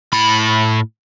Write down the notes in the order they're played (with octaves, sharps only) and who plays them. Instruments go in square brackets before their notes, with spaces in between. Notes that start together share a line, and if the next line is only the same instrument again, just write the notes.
[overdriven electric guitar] A2 B5